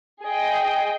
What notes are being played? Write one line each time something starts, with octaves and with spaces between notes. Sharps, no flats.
G#4 D#5 G5